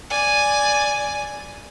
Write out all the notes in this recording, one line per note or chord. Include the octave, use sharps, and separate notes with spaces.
D5 G#5